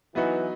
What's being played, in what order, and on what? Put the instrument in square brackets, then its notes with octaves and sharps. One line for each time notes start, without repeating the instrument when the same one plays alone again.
[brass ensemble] E3 [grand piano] F#3 B3 D#4 F#4